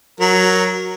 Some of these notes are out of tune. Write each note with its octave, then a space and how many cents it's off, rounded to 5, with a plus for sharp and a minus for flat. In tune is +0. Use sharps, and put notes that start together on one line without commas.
F#3 +0 A#4 +0